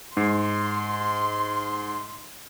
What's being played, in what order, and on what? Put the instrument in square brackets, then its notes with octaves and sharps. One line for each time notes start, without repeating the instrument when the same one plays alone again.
[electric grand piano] G#2 C7 [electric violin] C6